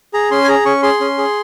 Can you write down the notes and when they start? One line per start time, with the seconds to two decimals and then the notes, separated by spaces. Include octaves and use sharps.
0.14 G#4 A#5
0.31 C#4 C6
0.44 G#5
0.48 G#4 A#5
0.66 C#4 C#6
0.83 G#4 C6
1.00 C#4
1.18 G#4